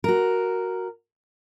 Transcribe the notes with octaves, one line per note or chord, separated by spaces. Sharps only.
F#4 A#4